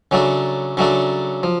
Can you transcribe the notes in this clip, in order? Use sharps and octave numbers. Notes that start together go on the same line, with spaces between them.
C#3 F#3 A3 D4
C#3 F#3 A3 D4
F3